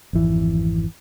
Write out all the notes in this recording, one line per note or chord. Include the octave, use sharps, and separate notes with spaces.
G#1 F2 E3